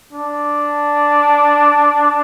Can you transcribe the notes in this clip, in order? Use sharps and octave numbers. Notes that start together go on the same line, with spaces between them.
D4